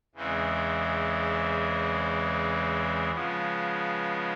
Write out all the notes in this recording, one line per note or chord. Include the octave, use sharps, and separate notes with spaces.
E2 C#3 E3 G#3 C4
C#3 F3 G#3 B3